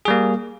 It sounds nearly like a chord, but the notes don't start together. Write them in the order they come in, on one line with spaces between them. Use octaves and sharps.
G#4 G3 A#3